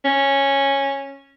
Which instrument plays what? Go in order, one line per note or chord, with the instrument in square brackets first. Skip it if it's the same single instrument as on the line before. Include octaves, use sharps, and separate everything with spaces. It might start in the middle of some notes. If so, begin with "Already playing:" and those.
[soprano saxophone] C#4